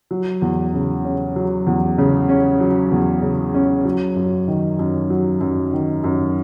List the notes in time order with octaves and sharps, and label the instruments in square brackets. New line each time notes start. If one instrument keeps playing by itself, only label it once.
[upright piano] F#3
E2
C#3
C#4
F#3
E2
C#3
C#4
F#3
E2
C#3
C#4
F#3
F#2
D#3
F#2
F#3
F#2
D#3
F#2